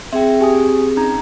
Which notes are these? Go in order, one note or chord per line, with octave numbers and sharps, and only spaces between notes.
C4 G#4 E5 G5
G4 G#5 D#6
C#4 D#4 A#5